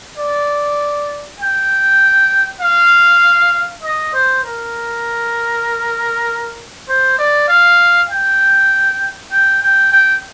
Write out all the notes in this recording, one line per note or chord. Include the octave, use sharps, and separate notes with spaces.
D5
G5
F5
D#5
C5
A#4
C5
D5
F5
G5
G5
G5
G5